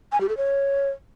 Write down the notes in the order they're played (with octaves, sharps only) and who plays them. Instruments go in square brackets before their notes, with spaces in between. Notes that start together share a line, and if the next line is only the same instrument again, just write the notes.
[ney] G#5
G4
A4
C#5